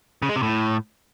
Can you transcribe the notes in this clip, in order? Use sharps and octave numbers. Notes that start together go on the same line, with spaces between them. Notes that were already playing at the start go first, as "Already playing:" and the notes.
C#3
G#3
C3
A2